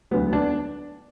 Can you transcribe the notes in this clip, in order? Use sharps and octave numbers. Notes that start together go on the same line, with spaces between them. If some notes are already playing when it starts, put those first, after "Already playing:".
E1 D2 D3 F#3 B3
D4